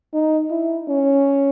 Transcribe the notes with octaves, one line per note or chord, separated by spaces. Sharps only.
D#4
E4
C#4